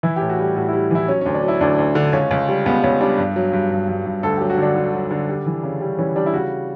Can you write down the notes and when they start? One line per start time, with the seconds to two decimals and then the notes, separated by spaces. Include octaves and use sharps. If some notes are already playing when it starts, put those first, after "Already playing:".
0.03 E3 E4
0.16 A2 G4
0.29 F#4
0.38 G3 G4
0.56 A2 F#4
0.69 G3 E4
0.91 E3 E4
1.08 F#3 C#4
1.21 D2 C#4
1.34 D4
1.43 F#3 E4
1.61 D2 D4
1.78 D2
1.95 D3
2.13 C#2 C#4
2.31 C#2
2.48 G3
2.66 C#2 B3
2.83 C#2 C#4
3.01 G3 D4
3.18 G2
3.36 F#3
3.53 G2
3.71 G2
3.88 G2
4.06 G2
4.23 D2 A4
4.37 F#3 G4
4.50 F#4
4.58 D3 D4
4.76 D3
4.93 F#3
5.11 D3
5.29 G3
5.46 E3
5.63 C#3
5.81 G3 C#4
5.99 E3 C#4
6.16 G3 D4
6.26 E4
6.33 C#3 F#4